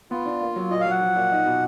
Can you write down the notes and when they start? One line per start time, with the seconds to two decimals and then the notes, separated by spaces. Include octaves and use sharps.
0.11 B3 F4
0.26 D4
0.41 A#3
0.56 F#3
0.71 A#2 D#5
0.80 F5
0.86 F#3 F#5
1.01 F3
1.16 A#2
1.31 D#4
1.46 B2